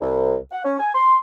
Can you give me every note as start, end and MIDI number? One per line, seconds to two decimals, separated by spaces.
0.01 0.36 36
0.52 0.63 78
0.64 0.77 61
0.79 0.90 80
0.94 1.16 84